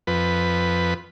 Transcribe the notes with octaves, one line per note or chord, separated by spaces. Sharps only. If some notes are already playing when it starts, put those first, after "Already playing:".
F2 B4